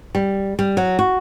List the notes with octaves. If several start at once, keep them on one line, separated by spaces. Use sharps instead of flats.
G3
G3
F#3
F#4